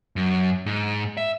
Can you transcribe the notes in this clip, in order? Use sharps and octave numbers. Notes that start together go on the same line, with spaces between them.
F#2
G#2
E5